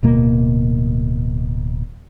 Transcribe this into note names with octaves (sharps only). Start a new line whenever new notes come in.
D1 B2 A#3